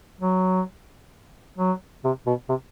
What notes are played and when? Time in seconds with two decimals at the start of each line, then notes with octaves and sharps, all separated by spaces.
0.21 F#3
1.58 F#3
2.04 C3
2.27 B2
2.49 C3